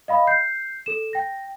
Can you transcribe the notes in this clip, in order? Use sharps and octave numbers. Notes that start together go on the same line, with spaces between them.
D#5 F5 B5
G6 C7
A4 E7
G5 A#6